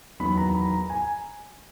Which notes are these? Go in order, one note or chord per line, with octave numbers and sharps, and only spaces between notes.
E2 D#3 F#3 B3 B5
A#5
A#5
B5
A#5
G#5